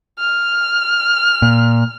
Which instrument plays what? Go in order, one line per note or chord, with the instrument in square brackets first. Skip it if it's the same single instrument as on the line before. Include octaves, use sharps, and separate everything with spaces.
[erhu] F6
[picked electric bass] A#2